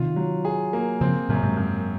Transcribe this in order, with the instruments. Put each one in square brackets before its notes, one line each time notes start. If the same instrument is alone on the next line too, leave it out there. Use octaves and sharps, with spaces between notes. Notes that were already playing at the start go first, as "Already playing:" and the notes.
Already playing: [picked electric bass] C3 D#3 [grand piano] F4
[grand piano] F#3
G#4
A#3
[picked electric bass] C#3 F3 [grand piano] C4
[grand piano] F#2 [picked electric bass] A#2 C#3
[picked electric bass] G#2 C3
[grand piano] F#2